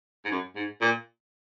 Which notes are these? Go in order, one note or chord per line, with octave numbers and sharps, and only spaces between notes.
G#2
F#2
G#2
A#2